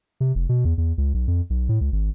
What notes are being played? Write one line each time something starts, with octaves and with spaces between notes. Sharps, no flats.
C3
F1
B2
E2
E2
C#2
B1
F2
B1
A2
C#2
G#1